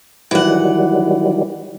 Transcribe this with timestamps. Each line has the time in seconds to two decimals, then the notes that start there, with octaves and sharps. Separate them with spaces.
0.31 D#3 E3 F#3 G3 F#5